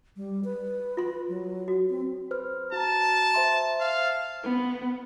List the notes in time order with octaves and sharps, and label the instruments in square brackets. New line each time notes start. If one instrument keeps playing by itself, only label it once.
[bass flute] G3
B4
[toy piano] F4 C6
[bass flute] F#3
[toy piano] F#4
[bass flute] C4
[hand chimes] B4 C5 F6
[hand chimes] F#4 A#5 [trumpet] A5
[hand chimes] C5 E5 C6
[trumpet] F5
[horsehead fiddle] B3